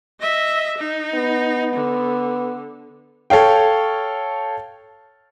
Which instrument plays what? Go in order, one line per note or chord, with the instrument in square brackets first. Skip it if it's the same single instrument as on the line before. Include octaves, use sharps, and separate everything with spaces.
[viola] D#5 E5
D#4
[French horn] B3
[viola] D3
[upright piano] A4 C#5 F5 G5